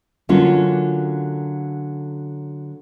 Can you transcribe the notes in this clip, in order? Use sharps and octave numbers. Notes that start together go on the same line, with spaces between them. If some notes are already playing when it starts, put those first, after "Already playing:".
D3 F#3 A#3 C#4 F4